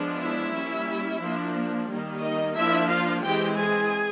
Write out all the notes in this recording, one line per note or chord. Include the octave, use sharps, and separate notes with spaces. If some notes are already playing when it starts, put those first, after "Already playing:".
Already playing: F3 G#3 B3 D4
E4 E5
G3 A#3 C#4
F3 A#3 D4
D#3 G3 A#3
D#4 D#5
F3 A#3 D4 E4 E5
F4 F5
E3 G#3 C4 G4 G5
G#4 G#5